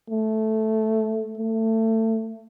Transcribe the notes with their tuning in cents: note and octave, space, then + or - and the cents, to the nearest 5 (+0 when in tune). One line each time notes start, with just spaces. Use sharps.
A3 -5
A3 +25